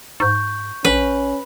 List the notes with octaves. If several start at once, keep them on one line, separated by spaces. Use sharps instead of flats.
G#2 C#6 G6
A#1 C#4 B4